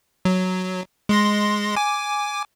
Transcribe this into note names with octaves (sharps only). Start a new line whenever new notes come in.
F#3
G#3 C6 A#6
G#5 D6